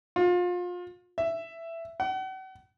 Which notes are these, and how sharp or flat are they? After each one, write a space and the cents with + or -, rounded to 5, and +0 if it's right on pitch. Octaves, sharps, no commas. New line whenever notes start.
F4 +30
E5 +10
F#5 +40